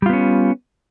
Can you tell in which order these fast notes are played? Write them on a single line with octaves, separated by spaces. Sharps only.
G3 F4 B3 C#4